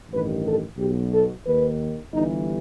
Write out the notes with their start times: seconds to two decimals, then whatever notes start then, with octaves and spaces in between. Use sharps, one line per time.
0.11 A1 G2 D#3 B4
0.45 A4
0.78 B1 B2 G4
1.11 A4
1.44 D#2 D#3 B4
2.12 G1 G2 E3 D#4